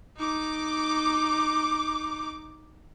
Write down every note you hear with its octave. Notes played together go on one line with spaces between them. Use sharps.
D#4 D6